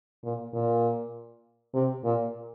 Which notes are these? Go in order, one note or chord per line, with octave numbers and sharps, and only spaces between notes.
A#2
A#2
C3
A#2